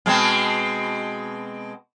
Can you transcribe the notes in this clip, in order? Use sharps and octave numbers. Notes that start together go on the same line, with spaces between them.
B2 G#3 C4